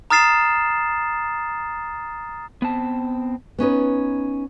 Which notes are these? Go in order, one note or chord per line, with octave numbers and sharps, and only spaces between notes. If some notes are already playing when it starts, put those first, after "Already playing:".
A#5 D#6 F6 A6 C7 E7
B3 C4 A5
B3 C#4 D#4 B4